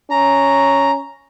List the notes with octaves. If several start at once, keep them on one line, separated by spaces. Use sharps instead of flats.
C#4 A#5